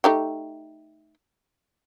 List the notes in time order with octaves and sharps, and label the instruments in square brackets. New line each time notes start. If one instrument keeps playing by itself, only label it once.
[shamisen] A3 D#4 G4